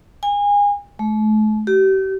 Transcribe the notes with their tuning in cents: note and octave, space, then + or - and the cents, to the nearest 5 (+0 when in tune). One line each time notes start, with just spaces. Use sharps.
G#5 -30
A3 -40
G4 -35